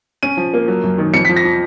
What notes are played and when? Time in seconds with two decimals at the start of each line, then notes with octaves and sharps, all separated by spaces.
0.23 C#4 D#7
0.37 F3
0.54 A#3
0.68 F#3
0.83 F#2
0.98 D#3
1.14 F2 C#7
1.25 B6
1.29 F3
1.36 A#6
1.44 F3